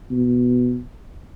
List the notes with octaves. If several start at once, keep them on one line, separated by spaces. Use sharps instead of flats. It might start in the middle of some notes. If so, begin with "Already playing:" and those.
B2